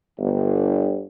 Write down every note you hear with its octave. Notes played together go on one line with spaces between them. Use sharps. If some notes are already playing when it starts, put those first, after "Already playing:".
G1